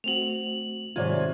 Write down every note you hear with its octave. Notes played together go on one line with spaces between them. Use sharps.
A3 C4 F#4 F7 F#7
G#2 C3 D#3 F#3 F4 C#5 D5 G#6